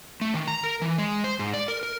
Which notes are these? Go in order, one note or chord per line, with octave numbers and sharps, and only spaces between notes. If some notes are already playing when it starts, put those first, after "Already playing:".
A3
D#3
A#5
A#4
E3
G#3
C5
G#2
D5
A#4
A#4